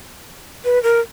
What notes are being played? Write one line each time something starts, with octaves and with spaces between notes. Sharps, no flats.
B4
A#4